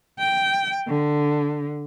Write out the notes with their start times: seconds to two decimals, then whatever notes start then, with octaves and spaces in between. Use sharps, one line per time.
0.19 G5
0.88 D3